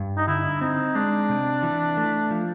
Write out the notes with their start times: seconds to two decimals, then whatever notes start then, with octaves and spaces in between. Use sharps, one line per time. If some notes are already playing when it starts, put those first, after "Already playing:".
Already playing: G2
0.17 D#4
0.27 D3 E4
0.61 C4 D#4
0.95 G#3 D4
1.29 C3
1.63 E3
1.97 A3
2.31 F3